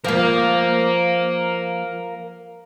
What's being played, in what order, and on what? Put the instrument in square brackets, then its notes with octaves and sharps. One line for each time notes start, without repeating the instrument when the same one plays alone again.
[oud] F3 A#3 [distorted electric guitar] A#4 F5